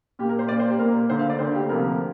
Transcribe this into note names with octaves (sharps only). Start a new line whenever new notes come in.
A#2 A#3 G4
A#4
C5
A#2 A#3 D5
C5
G4
A#2 A#3 A#4
D2 D3 A#3 C5
F5
D5
D2 D3 A#3 C5
G4
D2 C3 F3 A#3 A#4